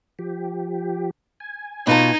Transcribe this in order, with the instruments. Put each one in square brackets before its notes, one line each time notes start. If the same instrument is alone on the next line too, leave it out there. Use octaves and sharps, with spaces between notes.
[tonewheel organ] F3 G4
G#5
[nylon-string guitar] B2 F4 A5 [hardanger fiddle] D#4